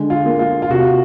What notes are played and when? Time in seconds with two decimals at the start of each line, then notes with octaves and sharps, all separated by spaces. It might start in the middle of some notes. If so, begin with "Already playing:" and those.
Already playing: D3 G#3
0.10 F4
0.25 A#3
0.39 F4
0.62 F4
0.70 C3 F#4